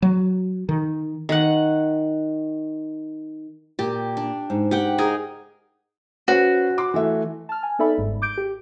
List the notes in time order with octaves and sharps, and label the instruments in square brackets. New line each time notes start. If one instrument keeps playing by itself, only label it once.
[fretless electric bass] F#3
D#3
[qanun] D#3 F#5
[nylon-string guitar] A#2 [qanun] G4
[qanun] D4
[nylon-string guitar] G#2
[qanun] G4 F#5 G5
D#4 G#4 A#4
[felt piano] C#4 B4 C5 [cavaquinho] F#4
[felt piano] C6 D6
E3 A3 E5
[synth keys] A5 F6
G#5
B3 D#4 A4 D5 E5 B5
G1 G#2
D6 G6 D7
G4